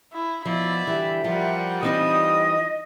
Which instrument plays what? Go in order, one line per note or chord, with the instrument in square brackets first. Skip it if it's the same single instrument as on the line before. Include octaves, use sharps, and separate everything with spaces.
[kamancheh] E4
[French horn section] B2 [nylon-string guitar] F3 [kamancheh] E4 D5
[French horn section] D3 G3 G4 [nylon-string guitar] E3 [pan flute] E5
[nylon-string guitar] F3 [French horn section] G3 F4 [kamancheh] A#4 F#5
[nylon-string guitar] E3 C4 D#4 [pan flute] D#5 [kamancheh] D#6